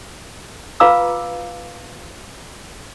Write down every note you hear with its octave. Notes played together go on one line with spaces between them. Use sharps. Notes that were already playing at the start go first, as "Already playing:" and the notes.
F4 B4 F5 A#5 D6 E6